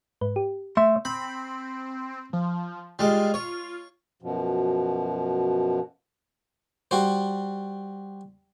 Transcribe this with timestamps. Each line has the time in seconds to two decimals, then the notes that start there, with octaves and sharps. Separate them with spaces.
0.21 G#2 B4
0.36 G4
0.77 A3 E5 C6
1.05 C4 B5
2.33 F3
2.99 G3 G#3 F4
3.34 C#5
4.22 F#2 B2 F3
6.91 G3 F#4 C5